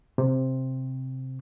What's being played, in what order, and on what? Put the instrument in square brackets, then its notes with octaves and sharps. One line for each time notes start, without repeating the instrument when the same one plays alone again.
[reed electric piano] C3